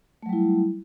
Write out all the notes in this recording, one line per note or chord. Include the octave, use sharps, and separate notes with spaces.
F#3 G3 A3 E4